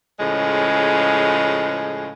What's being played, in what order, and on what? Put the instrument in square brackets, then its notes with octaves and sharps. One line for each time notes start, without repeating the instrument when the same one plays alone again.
[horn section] A2 C#3 F3 G#3